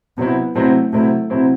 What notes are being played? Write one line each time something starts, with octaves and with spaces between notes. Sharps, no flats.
C3 F#3 B3 C4 E4
C3 F#3 A3 C4 E4
C3 F#3 A3 C4 E4
C3 F#3 C4 E4